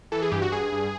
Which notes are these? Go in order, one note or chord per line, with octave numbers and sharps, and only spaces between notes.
E3 A4
G#4
G2 G4
F#4
G2 G#4
G2